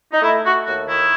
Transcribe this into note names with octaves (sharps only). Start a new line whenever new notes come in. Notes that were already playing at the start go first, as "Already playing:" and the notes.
D#4
A3 E4
A3 F#4
D#2 F#4
D#3 E4